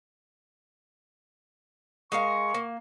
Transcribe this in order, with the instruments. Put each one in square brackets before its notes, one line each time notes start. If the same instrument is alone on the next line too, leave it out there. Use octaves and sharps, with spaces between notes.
[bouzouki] G#3 A#4 F5 [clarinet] C#6
[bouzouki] A#3